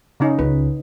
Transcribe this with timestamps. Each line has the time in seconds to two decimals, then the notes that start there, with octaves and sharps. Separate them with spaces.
0.20 C#3 C#4 D#4
0.39 C#2 B4